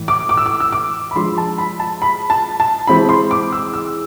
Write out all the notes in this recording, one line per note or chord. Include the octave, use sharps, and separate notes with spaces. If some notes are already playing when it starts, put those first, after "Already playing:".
Already playing: A2 E3
D6
D6
E6
D6
E6
D6
B5
F3 G#3 D4 C6
A5
B5
A5
B5
A5
A5
E3 G#3 C4 E4 B5
C6
D6
E6
E6